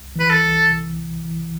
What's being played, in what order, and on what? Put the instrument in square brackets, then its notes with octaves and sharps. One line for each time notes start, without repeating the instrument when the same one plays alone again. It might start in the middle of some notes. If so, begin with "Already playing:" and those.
Already playing: [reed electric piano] C2
[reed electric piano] E3 [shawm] B4
[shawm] A4
[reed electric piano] C2
C3
C2
E3